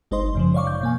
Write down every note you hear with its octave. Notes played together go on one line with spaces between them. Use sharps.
G1 G#3 D#4 C5 D#5 C6
F#2 C#3 F3
C#5 D5 F5 C#6 D6
G6
B2 A#3 G#5